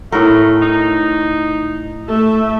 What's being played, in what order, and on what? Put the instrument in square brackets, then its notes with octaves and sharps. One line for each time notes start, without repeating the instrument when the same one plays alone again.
[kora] A2 A#4 [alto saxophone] A3
[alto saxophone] D#4
[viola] A3 E5 [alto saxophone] A4